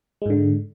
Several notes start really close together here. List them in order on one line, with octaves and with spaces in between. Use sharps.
G#3 G#2 D3